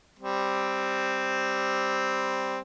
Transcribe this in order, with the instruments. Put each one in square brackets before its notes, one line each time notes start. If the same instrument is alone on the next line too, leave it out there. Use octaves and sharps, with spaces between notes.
[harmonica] G3 C4